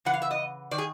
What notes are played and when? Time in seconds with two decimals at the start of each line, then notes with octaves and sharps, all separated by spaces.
0.05 C#3 E3 F#5
0.14 F5
0.22 E5
0.31 D#5
0.71 D#3 D5
0.78 G#4